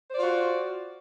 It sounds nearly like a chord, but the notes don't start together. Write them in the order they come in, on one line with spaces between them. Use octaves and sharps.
C5 D5 F4 F#4